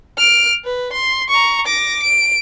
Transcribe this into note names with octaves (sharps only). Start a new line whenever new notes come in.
F6 D7
B4
C6
A#5 C#6
D6 A#6
D7